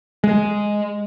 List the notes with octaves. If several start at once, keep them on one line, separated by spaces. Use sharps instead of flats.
G#3